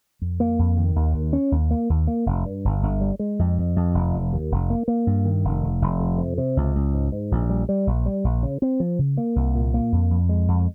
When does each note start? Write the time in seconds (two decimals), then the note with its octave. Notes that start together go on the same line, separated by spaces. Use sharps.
0.21 F2
0.40 A#3
0.59 F2
0.77 D#3
0.96 D#2
1.14 D#2
1.33 C#4
1.52 D#2
1.71 A#3
1.90 D#2
2.07 A#3
2.26 F1
2.45 G2
2.65 G1
2.82 G1
3.01 G3
3.19 G#3
3.39 F2
3.58 F2
3.76 F2
3.94 F1
4.13 F1
4.33 D#2
4.51 F1
4.70 A#3
4.88 A#3
5.07 G2
5.25 D#3
5.44 F1
5.63 F1
5.82 F1
6.00 F2
6.18 C3
6.38 C3
6.56 C#2
6.75 C#2
6.94 G#2
7.12 G#2
7.31 A#1
7.50 G3
7.69 G3
7.87 A#1
8.06 G3
8.24 A#1
8.43 C#3
8.62 C4
8.80 F3
8.99 C#3
9.17 A#3
9.36 C2
9.55 A#2
9.74 A#3
9.92 F2
10.11 F2
10.29 G#3
10.48 F2